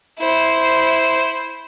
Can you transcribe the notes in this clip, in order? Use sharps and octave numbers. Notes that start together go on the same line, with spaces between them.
E4 C5